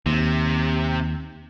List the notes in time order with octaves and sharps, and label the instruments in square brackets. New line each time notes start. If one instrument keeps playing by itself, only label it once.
[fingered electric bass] D#2 [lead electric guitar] C3